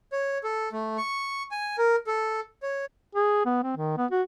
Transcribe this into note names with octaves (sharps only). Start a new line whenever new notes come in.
C#5
A4
A3
C#6
G#5
A#4
A4
C#5
G#4
B3
C4
D#3
B3
F#4